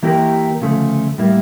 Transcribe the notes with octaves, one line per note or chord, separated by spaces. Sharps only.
E3 A#3 E4 G4 A#4
D2 C#3 F3 A3
A2 G3 A#3 E4